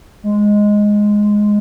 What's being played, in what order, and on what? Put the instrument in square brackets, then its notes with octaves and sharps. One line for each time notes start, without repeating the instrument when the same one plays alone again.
[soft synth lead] G#3